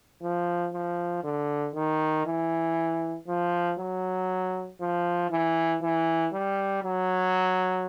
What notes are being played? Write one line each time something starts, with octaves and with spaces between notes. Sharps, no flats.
F3
F3
D3
D#3
E3
F3
F#3
F3
E3
E3
G3
F#3